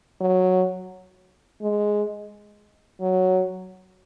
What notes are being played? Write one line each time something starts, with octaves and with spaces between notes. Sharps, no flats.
F#3
G#3
F#3